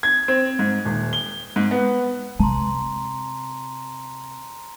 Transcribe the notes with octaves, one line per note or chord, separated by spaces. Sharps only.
G#6
C4
G#2
D#1
G7
G#2
B3
C3 A5 A#5 C6